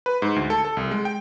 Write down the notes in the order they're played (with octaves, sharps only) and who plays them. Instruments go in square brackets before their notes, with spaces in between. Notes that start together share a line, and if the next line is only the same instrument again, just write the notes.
[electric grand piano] B4
G#2
D2
A4
A4
C2
G#3
G5